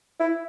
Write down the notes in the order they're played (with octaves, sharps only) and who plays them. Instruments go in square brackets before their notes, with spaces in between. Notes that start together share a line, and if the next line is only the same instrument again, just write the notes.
[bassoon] E4